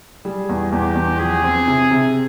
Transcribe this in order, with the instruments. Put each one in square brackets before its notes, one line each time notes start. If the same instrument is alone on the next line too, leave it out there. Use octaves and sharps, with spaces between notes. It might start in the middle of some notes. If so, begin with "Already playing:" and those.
[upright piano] G3 [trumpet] G#4
[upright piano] E2
[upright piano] E2 [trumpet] G4
[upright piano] E2
[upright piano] F3 [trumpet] G#4
[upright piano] C4
C3
C3